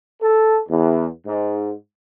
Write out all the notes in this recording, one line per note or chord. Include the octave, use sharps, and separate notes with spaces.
A4
E2
G#2